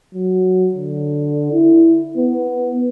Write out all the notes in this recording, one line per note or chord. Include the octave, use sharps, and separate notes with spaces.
F#3
D3
E4
B3